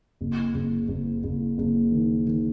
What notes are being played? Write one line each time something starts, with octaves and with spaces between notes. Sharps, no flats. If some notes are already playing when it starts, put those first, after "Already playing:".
F#1
F#1
F#1
F#1
F#1
D#3
D#3